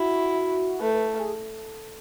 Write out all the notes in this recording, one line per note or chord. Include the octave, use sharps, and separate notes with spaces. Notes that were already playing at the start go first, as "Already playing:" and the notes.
Already playing: E4 F#4
A3 B4
B4
G#4